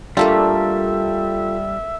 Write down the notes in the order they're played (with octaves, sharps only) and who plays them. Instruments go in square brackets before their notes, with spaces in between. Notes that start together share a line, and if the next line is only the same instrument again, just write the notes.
[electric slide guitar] G3 [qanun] A3 A#3 D4 [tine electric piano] F4 A4 [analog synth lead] E5